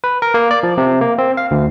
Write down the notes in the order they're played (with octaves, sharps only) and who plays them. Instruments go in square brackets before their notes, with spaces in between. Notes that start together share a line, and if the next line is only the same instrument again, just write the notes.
[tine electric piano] B4
A#4
A#3
D5
F3
C3
A#3
C4
F5
D2